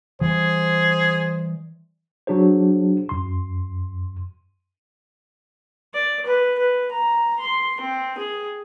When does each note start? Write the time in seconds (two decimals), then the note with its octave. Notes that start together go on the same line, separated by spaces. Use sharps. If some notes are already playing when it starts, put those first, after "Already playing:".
0.21 E3 G3 G#4 C5
2.27 F#3 D4 G#4 C5
3.09 F#2 C6
5.94 D5
6.25 B4
6.58 B4
6.91 A#5
7.39 C6
7.80 C4
8.18 G#4